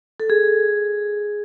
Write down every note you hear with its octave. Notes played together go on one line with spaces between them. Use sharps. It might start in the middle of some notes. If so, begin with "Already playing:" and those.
A4
G#4